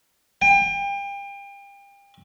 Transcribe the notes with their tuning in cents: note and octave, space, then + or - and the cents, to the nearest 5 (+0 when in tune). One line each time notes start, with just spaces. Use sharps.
G5 +35